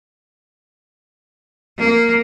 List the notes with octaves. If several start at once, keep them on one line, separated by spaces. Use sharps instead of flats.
A#3